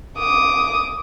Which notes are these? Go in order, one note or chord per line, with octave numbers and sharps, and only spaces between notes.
D6 D#6